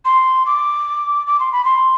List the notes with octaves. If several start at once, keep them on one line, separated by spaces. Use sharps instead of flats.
C6
D6
D6
C6
B5
C6